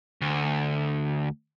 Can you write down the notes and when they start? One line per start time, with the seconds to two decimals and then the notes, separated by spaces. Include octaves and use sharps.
0.21 D2